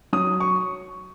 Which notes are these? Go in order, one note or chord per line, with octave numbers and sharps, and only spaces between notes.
F#3 D#6
C#6